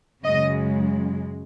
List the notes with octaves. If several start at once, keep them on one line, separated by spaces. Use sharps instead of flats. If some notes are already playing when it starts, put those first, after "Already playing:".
F#2 C#3 G#3 D#5